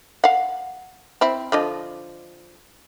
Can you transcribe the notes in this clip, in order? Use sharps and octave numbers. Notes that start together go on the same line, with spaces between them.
F5 F#5
C4 E4
D3 F3 D#5